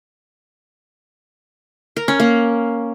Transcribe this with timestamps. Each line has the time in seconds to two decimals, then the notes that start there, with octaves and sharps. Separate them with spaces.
1.96 A#4
2.08 C#4
2.20 A#3